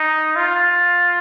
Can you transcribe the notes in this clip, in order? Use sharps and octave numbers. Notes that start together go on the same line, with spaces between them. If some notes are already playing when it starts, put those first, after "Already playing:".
Already playing: D#4
F4